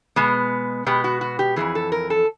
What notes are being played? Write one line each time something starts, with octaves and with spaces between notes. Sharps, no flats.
B2 G#3 B3
B2 G#3 B3 G4
F#4
F#4
G4
F2 C#3 E3 G#4
A4
A#4
A4